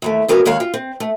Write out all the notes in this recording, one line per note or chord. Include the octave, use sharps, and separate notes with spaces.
D#2 E3 A3
C#3 F#3 B3 A#4 F#5 G#5
D#2 D#3 G#3 C#5 F5 F#5
F4
C4
A3